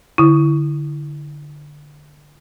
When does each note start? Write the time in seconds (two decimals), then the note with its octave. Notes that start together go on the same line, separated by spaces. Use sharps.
0.18 D3 E4